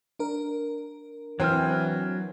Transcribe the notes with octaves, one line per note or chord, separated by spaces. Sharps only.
D4 A#4
E3 F#3 C4 G#5 F6